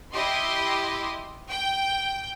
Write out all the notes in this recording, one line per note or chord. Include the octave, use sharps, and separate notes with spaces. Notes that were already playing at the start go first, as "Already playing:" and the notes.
E4 G4 D#5 C6
G5